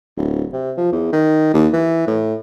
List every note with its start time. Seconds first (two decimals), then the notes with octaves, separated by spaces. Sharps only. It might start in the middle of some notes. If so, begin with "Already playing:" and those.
0.17 D1
0.53 C3
0.77 F3
0.92 E2
1.13 D#3
1.54 D#2
1.73 E3
2.07 A2